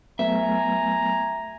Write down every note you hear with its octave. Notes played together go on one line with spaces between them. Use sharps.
F#3 A3 B3 E5 G#5 A#5